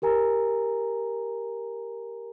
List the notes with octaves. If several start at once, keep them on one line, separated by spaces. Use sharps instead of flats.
G4 A#4 G#5 A#5